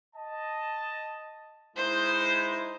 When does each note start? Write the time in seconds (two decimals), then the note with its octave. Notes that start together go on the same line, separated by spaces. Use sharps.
0.15 D#5 A5
1.76 G#3 D#4 E4 C5